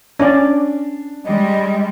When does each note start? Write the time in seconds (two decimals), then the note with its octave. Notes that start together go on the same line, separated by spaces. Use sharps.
0.19 C#4 D4 D5
1.25 G3 G#3 D#5